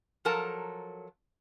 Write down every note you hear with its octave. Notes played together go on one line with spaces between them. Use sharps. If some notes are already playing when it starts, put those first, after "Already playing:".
F3 F#3 A4 A#4 A5 A#5